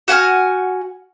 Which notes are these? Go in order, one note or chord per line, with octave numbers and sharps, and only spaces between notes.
F#4 F#5 G#5 F6